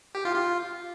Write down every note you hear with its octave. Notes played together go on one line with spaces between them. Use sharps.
G4
F4
F4